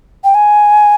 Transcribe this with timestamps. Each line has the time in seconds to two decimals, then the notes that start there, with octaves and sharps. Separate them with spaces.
0.24 G5
0.35 G#5